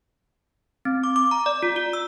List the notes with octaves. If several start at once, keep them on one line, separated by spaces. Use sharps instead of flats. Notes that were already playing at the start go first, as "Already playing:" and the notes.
C4
D6
D6
A#5
D5
F4
F4
E6